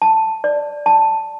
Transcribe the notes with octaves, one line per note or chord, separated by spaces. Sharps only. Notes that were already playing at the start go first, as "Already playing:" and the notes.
A5
D5
A5